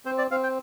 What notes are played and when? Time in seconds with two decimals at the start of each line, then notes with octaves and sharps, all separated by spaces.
0.05 C4 C5
0.18 D5
0.31 C4 F5
0.43 G5